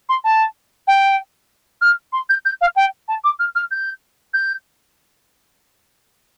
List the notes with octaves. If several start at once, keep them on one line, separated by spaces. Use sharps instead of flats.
C6
A5
G5
F6
C6
G6
G6
F5
G5
A5
D6
F6
F6
G6
G6